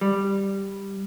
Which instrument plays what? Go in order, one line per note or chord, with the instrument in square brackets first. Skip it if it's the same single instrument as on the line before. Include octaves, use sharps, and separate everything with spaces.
[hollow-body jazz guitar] G3